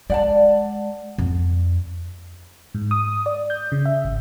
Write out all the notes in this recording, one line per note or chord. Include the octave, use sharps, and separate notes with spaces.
G#3 D5 F#5 A5
F2
G#2
D#6
D5
G6
C#3
E5
G#1